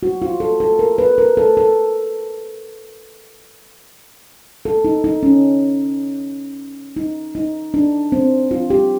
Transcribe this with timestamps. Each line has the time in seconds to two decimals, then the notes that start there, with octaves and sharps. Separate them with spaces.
0.03 F#4
0.22 F4
0.40 A4
0.60 A4
0.79 A#4
0.98 B4
1.18 A#4
1.37 A4
1.57 A4
4.65 A4
4.85 D#4
5.04 D#4
5.23 C#4
6.96 D#4
7.35 D#4
7.74 D4
8.12 C4
8.51 F4
8.70 G4